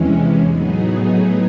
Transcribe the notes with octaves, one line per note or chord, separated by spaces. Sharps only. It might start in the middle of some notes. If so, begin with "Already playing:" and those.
Already playing: E2 C3 E3 G#3 C#4
A2 F#3 B3 D#4 G#4